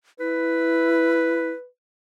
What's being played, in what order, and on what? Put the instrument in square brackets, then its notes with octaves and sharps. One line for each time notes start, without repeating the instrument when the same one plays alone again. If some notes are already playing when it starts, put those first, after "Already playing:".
[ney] E4 [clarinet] B4